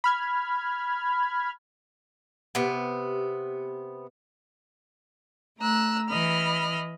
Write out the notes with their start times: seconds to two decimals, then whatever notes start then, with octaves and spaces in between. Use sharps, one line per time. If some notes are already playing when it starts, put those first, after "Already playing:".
0.04 B5 F6 G#6
2.55 C3 B3
5.59 A3 A#5 E6 F#6
6.08 E3 D#5 B5 F6